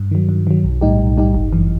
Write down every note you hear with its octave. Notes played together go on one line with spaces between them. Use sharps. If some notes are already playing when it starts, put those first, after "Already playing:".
Already playing: G2
D#3 F#3
G2
D#3 F#3
B1
A2 G3 D#4 G4
B1
A2 G3 D#4 G4
G1
F#2 E3